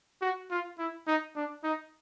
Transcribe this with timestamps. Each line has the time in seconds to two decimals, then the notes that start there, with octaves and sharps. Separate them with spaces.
0.22 F#4
0.51 F4
0.79 E4
1.07 D#4
1.36 D4
1.64 D#4